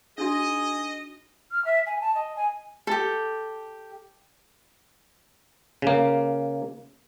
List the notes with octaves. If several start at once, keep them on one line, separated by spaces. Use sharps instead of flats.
D4 D#4 F#4 G#4 D#5
F6
E5
G#5
A5
D#5
G#5
G4 A4
C#3 A#3